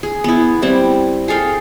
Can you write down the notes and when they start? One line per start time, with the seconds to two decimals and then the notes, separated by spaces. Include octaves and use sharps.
0.03 G#4
0.24 B3 E4
0.62 G3 C4 E4
1.28 G#4 A4 F5 G5